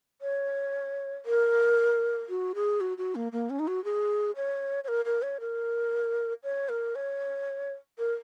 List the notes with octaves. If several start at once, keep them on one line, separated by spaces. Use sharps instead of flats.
C#5
A#4
F#4
G#4
F#4
F#4
A#3
A#3
C#4
D#4
F#4
G#4
C#5
C#5
A#4
A#4
C#5
A#4
C#5
A#4
C#5
A#4